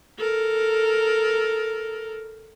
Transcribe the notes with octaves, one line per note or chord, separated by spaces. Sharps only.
A4 A#4